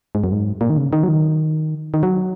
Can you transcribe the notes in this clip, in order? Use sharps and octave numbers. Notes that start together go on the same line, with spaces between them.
G#2
F#2
G#2
A#2
D#3
C#3
D#3
F#3
D#3
D#3
F#3